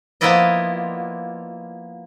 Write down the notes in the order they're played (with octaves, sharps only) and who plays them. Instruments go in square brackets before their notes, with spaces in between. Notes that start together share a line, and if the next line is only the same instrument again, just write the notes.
[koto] F3 A#3 B3 E4 D5 D#5